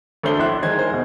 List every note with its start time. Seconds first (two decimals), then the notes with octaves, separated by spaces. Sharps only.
0.23 D2 A3 D4 C5 G7
0.39 A#1 E4 E5 C6 F#6
0.62 D#3 G#3 C5 G#6
0.78 G#3 D#4 A#4 C5
0.90 D#2 B2